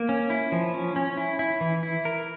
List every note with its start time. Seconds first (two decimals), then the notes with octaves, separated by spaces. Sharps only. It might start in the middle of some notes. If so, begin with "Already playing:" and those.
Already playing: A#3
0.09 C#4
0.30 E4
0.52 F3
0.74 C#4
0.96 C#4
1.17 E4
1.39 E4
1.61 E3
1.83 E4
2.05 A#4